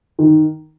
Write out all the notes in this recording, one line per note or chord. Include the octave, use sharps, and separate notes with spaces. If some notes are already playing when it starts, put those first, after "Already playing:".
D#3